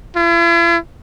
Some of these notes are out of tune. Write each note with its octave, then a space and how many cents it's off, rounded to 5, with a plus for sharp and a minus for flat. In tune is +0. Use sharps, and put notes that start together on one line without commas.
E4 +45